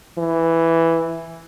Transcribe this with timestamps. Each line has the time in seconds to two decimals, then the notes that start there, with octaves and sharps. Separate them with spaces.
0.18 E3